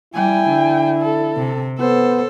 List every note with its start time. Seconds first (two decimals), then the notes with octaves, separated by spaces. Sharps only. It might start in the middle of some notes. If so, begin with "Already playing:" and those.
0.14 G3 E4 G5 G#5
0.49 D3
1.01 A4
1.37 C3
1.80 B3 A4 C5